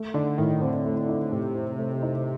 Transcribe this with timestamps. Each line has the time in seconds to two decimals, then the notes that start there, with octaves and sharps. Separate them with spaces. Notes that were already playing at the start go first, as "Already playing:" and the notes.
Already playing: A3
0.14 D3 D#4
0.38 A2 D#3
0.61 D3 C4
0.85 A3
1.08 D#4
1.32 A2 C3
1.55 C4
1.78 A3
2.02 D#4